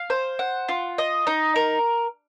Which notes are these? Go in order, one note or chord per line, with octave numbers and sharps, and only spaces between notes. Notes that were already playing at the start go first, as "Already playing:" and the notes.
Already playing: F5
C5
F#5
F4
D#5
D#4
A#4